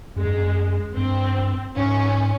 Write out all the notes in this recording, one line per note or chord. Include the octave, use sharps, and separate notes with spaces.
F#2 G#3
G2
F#2
G2 C4
G#2 C#4